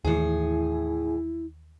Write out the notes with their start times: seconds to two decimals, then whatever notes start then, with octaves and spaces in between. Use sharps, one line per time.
0.05 D#2 A2 D#3 E3 E4 G#4